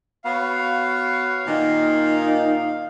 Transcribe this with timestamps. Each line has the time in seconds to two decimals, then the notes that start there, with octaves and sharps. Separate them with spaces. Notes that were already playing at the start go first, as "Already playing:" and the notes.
0.24 B3 F#4 C#5 F5
1.46 A#2 D#3 D#4